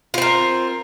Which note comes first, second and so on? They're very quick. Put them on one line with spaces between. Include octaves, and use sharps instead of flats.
F4 C4 A#4